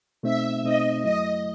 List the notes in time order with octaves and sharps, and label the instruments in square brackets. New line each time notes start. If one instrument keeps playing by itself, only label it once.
[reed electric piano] B2 A3 C4 D#4 [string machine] E5
[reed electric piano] B2 A3 C4 D#4 [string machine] D#5
[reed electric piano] F#2 F#3 A3 E4 [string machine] D#5